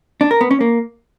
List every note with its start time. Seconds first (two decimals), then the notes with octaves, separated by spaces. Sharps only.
0.21 D4
0.31 A#4
0.41 B3
0.51 C#4
0.61 A#3